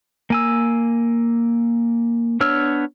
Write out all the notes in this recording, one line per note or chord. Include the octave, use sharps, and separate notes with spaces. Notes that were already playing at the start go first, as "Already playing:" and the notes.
A#3 G#5 E6
B3 D4 C#5 E6 F6